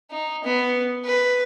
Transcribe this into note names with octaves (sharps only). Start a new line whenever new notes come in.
D#4
B3
B4